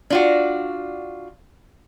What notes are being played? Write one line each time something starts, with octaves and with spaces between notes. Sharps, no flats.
D4 F4 F#4